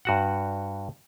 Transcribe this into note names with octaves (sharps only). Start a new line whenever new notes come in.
G2 F#4 F#5